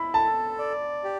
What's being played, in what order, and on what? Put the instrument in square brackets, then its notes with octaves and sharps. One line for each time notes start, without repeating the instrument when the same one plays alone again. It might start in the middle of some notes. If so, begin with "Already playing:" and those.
Already playing: [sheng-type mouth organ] E4 [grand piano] B5
[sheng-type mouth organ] A4 [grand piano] A5
[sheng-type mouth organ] D5
G4